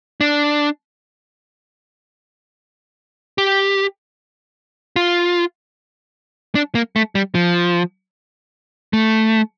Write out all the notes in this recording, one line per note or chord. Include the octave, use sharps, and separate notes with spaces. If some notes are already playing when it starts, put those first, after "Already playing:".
D4
G4
F4
D4
A#3
A3
G3
F3
A3